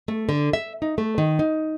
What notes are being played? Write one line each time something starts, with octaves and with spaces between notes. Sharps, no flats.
A3
D3
E5
D#4
A3
D#3
D#4